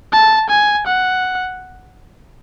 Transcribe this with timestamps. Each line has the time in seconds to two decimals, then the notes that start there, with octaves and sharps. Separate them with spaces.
0.13 A5
0.50 G#5
0.87 F#5